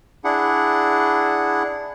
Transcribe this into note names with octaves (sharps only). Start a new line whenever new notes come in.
D4 E4 G#4 F#5